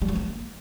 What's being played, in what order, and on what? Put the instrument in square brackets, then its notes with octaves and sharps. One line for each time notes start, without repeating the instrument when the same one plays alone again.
[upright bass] G3
F#3
A#3